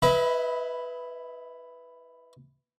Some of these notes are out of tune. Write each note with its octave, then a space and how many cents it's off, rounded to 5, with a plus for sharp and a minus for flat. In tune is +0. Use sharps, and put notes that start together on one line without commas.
E4 +5 B4 +0 D#5 +45